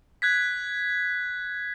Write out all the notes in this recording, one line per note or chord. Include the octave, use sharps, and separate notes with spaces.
F#6 G#6 B6